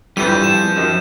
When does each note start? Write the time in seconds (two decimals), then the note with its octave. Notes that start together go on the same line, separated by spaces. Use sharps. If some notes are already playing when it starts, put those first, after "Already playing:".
0.17 F2 E3 G3 D4 G4 B4 G6 D#7
0.44 F3 E7
0.76 F#2 D#3